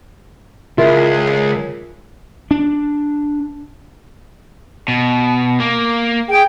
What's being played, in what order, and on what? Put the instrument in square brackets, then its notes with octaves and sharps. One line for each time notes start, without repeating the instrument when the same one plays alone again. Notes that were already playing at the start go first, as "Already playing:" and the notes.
[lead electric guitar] C#2 [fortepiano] E4 [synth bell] F4 A#4 [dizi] G#4
[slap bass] D4
[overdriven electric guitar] B2
A#3
[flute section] G#4 G5